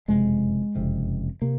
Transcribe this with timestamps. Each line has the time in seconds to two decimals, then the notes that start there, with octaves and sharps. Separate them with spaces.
0.08 F#1 F2 C3 G#3
0.75 F#1 F2 C3
1.42 C3 A#3